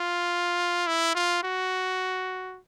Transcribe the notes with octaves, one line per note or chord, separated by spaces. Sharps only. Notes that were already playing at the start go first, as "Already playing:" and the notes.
Already playing: F4
E4
F4
F#4